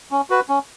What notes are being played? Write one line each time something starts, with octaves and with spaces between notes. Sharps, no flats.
C#4
F#4 B4
C#4